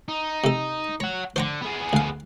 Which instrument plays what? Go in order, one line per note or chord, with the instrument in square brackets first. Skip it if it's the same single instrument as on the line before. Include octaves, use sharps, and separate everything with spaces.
[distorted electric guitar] D#4
[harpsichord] C3 A4
[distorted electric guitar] C#5 F#5 [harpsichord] A#5
[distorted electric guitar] D3 [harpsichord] C5 F#5 A#5
[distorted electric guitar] B3 G#4
[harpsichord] D2 F5